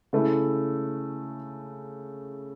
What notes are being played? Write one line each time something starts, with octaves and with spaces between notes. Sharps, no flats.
C#3 A3 E4